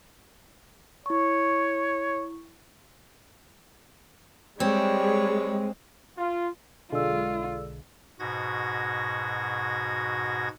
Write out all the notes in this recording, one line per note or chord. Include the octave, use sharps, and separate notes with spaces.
E4 C#5 C#6
G3 G#3 C4 C#5
F4
B1 D3 G#3 F4 A4 D5 E6
G#2 B2 F#4 G#6 A#6